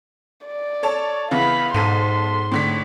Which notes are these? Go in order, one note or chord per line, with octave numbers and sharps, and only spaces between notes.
D5
A4 C#5 A5
C#3 E3 B3 F5 B5
B1 G#2 A4 C6 D#7
A2 D3 B6